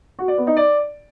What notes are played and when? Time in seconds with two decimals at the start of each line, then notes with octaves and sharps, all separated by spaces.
0.19 F#4
0.28 D5
0.38 B3
0.47 D#4
0.57 D5